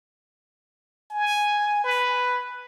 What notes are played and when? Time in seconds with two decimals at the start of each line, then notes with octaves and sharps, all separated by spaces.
1.11 G#5
1.84 B4